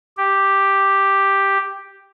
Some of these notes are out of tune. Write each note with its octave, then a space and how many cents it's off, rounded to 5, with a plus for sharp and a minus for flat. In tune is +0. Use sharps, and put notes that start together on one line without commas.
G4 +0